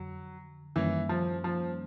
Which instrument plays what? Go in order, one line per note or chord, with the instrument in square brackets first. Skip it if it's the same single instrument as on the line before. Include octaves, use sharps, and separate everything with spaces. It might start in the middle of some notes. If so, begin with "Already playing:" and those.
Already playing: [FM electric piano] F2 D3 [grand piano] F#3
[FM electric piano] F#2 D#3 G3 A#3 C#4 [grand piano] E3
[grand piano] F3
F3